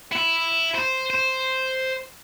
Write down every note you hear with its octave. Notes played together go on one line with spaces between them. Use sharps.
E4
C5
C5